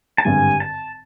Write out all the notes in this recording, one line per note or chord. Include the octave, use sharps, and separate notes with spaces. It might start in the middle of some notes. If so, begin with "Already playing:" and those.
A5
G#1 G2 D3 G3 G#5
A5